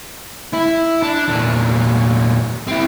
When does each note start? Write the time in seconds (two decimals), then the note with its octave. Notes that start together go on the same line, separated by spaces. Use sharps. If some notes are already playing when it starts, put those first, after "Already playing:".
0.53 E4
1.03 D4
1.28 E2 A#2
2.67 C4 E4